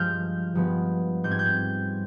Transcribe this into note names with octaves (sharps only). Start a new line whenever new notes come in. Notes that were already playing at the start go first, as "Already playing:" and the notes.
Already playing: G2 F3 G#3 F6 G6
G2 F3 G#3 B3
G#2 G3 C4 G6
G#6
G6